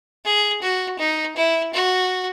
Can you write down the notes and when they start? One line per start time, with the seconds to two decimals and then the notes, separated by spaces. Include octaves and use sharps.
0.25 G#4
0.62 F#4
0.99 D#4
1.36 E4
1.73 F#4